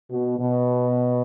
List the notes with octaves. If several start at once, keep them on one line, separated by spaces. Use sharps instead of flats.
B2
B2